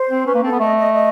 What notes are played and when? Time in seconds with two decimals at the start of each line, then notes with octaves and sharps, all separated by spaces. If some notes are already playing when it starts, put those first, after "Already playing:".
Already playing: C5
0.09 C4
0.26 C#4 B4
0.34 A#3
0.43 C4 A4
0.52 B3
0.59 A3 D#5
0.77 D#5
0.93 D#5